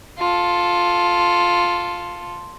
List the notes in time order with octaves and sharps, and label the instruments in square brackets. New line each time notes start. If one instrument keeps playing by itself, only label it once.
[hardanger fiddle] F4 A4